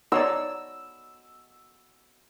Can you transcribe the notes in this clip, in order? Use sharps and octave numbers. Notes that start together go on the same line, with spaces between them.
D#4 C#5 D5 E6